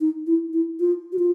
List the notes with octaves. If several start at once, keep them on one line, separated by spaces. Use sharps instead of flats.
D#4
E4
E4
F4
F#4
F4